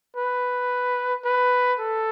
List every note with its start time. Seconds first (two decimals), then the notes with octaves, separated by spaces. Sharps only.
0.17 B4
1.25 B4
1.80 A4